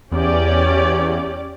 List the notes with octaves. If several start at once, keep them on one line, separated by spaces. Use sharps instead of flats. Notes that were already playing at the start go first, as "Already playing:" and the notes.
E2 C#4 G4 D5